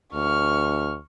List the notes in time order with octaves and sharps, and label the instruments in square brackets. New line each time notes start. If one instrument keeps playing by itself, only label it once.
[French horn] D2 [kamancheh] C#6 F6